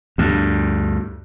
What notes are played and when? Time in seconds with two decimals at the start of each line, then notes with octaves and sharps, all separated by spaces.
0.18 D2 G2